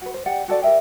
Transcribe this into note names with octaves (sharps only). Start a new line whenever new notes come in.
F#4 B4
C5
G4 D5 F#5 G5
F#4 A4 D5
G4 A#4 E5 G5